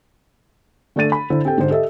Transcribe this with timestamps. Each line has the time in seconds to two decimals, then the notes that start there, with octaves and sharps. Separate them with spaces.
0.96 D3 A3 D4 D5 A6 D#7
1.12 B5
1.30 D3 E4 C5
1.45 C4 G4 A4 G5
1.58 G#2 D3 C5
1.69 G4 A4 D#5 E5